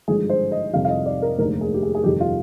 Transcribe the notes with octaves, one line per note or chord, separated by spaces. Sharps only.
G#1 G2 D3 F3 G#3 G#4
C5
D#5
F2 C3 D#3 G3 F5
F5
D#5
D5
A#4
F1 D#2 D3 G#3 A#4
G#4
G4
G#4
G#4
G1 F2 C3 D#3 G4
F4